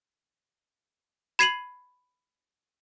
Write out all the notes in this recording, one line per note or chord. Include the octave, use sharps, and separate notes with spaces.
B5 G#6 C7 D#7 F7 F#7